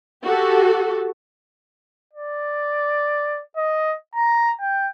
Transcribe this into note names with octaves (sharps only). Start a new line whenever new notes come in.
F#4 G4 A4
D5
D#5
A#5
G5